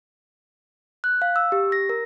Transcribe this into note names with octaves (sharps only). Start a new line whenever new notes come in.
F#6
F5
E6
G4
A#6
A#4